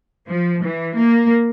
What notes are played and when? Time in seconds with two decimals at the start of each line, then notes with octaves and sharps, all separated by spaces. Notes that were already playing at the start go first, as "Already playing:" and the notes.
0.28 F3
0.64 E3
0.96 A#3